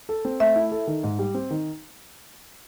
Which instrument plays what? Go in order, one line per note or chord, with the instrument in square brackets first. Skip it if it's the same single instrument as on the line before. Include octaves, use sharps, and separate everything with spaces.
[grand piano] A4
C4
[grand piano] A3 [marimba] E5
[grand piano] E4
A4
D#3
G#2
G3
C4
D#3